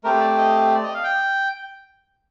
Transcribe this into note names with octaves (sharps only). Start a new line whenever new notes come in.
A3 C4 G4 A#4
D5
D#5
D5
D#5
F5
G5